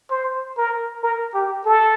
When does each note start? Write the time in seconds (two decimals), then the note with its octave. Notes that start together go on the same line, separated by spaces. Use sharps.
0.10 C5
0.57 A#4
1.03 A#4
1.34 G4
1.66 A4